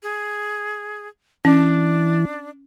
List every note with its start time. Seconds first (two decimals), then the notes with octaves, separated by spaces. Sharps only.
0.03 G#4
1.45 E3 C#4 D4